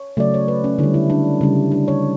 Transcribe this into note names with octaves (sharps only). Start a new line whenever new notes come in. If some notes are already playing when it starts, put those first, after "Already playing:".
Already playing: C#5
C#3 F#3 A3 D5
C#5
B4
C#4
D3 G3 E4
E4
D4
C#3 G3
D4
C#5